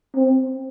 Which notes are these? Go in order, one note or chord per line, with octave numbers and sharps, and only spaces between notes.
C4